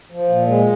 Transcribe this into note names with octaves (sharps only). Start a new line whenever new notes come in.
F3
A#2
G#3